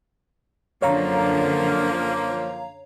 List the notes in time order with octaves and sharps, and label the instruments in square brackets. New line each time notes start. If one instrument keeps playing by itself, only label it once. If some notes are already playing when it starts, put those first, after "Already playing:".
[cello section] F#2 D3 [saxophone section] F3 A#3 [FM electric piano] C#5 F5 A#5